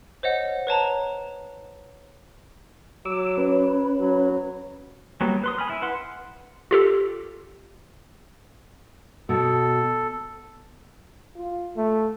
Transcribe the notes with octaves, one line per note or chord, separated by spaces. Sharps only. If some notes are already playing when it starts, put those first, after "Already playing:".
C5 C#5 D#5 F#5
B4 C#5 A5 A#5
F#3 D6 E6
C#4 B4
F#3
F#3 G3 A#3 B3
B4 C6 D#6
G#5 B5 F6
E4
B4 F#5 C6
F4 G4 A4
B2 A4
F4
A3